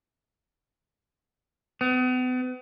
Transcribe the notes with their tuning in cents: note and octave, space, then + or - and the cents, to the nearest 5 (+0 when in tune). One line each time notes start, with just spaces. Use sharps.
B3 +40